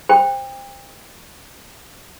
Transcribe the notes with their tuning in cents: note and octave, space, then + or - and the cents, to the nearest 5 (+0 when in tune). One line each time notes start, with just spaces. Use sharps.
C5 +0 G5 +30